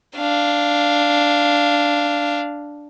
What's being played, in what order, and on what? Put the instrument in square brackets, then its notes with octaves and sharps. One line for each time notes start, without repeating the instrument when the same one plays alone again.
[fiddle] D4 F5